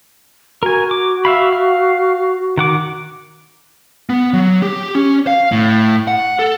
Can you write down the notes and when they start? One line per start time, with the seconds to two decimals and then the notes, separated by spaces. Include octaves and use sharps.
0.63 F#4 A#4 G#5
0.91 D6
1.25 E5 F5 B5
1.52 F5
2.58 D#3 F#5 D6
4.09 B3
4.34 F#3
4.63 G4
4.95 C#4
5.27 F5
5.52 A2
6.08 F#5
6.39 A4